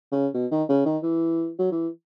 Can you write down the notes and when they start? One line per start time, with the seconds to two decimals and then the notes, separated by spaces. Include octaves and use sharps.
0.12 C#3
0.34 B2
0.51 D#3
0.69 C#3
0.86 D#3
1.03 E3
1.59 F#3
1.71 E3